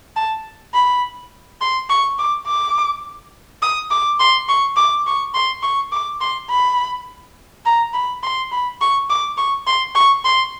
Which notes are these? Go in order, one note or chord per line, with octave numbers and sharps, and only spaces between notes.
A5
B5
C6
C#6
D6
D6
D#6
D6
C6
C#6
D6
C#6
C6
C#6
D6
C6
B5
A#5
B5
C6
B5
C#6
D6
C#6
C6
C#6
C6